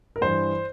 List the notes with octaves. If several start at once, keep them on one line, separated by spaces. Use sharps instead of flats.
A#4
G2 E3 C5